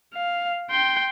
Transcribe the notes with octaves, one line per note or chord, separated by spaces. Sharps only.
F5
G5 C6